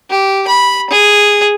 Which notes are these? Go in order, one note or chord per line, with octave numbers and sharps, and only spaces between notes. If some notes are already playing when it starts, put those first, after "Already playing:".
G4
B5
G#4